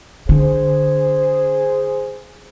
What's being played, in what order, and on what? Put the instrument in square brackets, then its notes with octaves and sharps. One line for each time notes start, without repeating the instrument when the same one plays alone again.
[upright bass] D3 [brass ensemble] G#4 C5